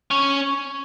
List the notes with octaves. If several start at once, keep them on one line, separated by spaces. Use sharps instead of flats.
C#4